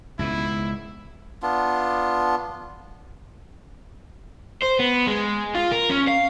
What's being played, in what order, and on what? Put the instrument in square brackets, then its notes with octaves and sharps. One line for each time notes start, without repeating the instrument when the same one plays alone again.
[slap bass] C#2 G#2 B2 [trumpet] E4
[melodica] B3 D4 F4
[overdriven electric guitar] C5
B3
G#3
F4
A#4
C#4
F5